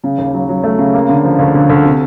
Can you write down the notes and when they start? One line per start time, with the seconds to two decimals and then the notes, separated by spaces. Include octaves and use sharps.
0.04 C#3
0.18 D#2
0.34 F#3
0.49 F#3
0.63 A3
0.78 C#3
0.94 A#3
1.09 D3
1.24 F3
1.39 D2
1.54 D3
1.69 D2
1.85 C3